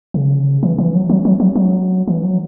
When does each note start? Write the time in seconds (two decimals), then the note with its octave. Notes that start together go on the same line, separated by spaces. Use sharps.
0.14 C#3
0.63 E3
0.78 E3
0.95 F#3
1.10 F#3
1.25 F#3
1.40 F#3
1.56 F#3
2.08 E3
2.23 F#3